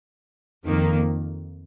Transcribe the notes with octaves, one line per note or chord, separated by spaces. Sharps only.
F2 D#3 A#3